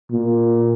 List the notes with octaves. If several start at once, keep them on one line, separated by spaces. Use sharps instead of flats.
A#2